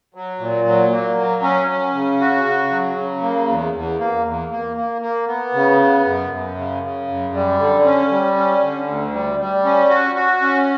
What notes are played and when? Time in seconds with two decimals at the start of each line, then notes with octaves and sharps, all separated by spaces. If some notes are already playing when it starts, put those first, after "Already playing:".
0.14 F#3
0.39 A#2
0.66 F#3
0.92 A#3
1.17 F#3
1.42 C#4
1.68 C#4
1.94 C#3
2.20 F#4
2.45 C#3
2.70 F#3
2.97 C#3
3.22 A#3
3.48 E2
3.73 E2
3.99 A#3
4.25 E2
4.51 A#3
4.77 A#3
5.01 A#3
5.27 B3
5.54 C#3
5.80 B3
6.05 F#2
6.30 F#2
6.57 C#3
6.82 C#3
7.08 F#2
7.34 G3
7.59 D3
7.85 C#4
8.11 G3
8.37 C#4
8.62 D3
8.87 D2
9.13 G3
9.39 G3
9.65 C#4
9.90 F#4
10.15 F#4
10.42 C#4